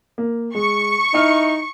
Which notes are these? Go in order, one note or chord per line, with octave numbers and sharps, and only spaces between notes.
A#3
G#3 C#6
D#4 E4 E5 F6